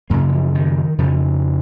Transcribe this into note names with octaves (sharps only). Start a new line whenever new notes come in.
F#2 C#3 A#3
D#3
F3
D#3
F2 C#3 F3